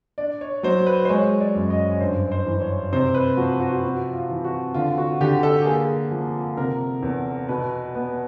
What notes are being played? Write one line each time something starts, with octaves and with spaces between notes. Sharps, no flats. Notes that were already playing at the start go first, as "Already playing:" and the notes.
D4 D5
C#5
F#3 C5
B4
C5
G#3 C#5
D5
F#2
D#5
C#5
G2 C5
C5
E3
C#5
C3 C5
B4
F3 F#4
F#4
C4 F#4
F4
E3
F#4
D3 F4
F#4
D3 G4
A4
G4
A#3 G#4
F3
C3 A#4
E2
B2 B4
B3